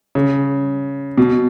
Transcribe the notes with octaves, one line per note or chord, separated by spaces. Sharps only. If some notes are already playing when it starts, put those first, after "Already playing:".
C#3
B2